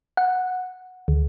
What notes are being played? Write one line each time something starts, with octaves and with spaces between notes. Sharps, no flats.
F#5
D2